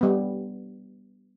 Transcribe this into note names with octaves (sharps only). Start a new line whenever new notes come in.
G3 B3